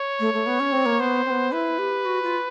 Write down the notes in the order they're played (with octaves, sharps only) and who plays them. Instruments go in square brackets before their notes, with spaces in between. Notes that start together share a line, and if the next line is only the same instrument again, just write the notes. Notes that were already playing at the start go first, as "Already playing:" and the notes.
Already playing: [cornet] C#5
[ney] A3
A3
B3
C#4
C4
A#3
[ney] B3 [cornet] C5
[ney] C4
B3
[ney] E4 [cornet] B4
[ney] G4
F#4
F4